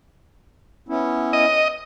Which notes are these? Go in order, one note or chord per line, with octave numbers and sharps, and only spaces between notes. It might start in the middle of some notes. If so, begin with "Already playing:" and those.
B3 C#4 E4
D#5